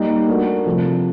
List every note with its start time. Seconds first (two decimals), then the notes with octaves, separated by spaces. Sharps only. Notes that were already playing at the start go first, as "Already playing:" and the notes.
Already playing: G3 A#3 D#4
0.28 A3 D4 F#4 A#4
0.65 C3 F3 A3